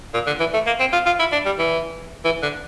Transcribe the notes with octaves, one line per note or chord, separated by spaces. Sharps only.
A#2
D3
E3
A3
A#3
C4
F4
F4
E4
D4
G3
E3
E3
D3